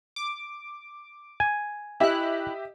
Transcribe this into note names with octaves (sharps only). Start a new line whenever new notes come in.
D6
G#5
E4 G4 D#5 E5 F#6